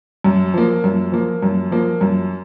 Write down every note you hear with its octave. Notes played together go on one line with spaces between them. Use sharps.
F#2
F3 A#3
F#2
F3 A#3
F#2
F3 A#3
F#2